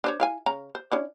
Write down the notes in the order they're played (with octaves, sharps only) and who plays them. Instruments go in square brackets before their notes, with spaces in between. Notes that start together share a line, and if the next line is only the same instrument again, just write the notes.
[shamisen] D4 C5 C#5
E4 F5 G#5
C#3 A#5
C5
C#4 D4 E4